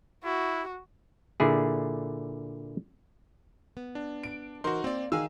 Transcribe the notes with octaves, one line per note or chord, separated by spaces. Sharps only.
E4 F#4
A#2 D3 E4 G#4
B3
D4
D7
E3 D#4 F#4 A#4 C5 C6
A#3 C4 D5
D#3 G#4 F5 G#5 E6